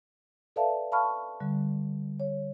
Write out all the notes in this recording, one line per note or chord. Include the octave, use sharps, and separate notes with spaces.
A4 B4 D5 E5 F5 A5
F5 A5 B5 C#6 F6
D3 G3
C#5